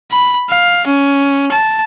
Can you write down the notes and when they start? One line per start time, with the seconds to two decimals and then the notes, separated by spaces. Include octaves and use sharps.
0.11 B5
0.49 F5
0.87 C#4
1.52 A5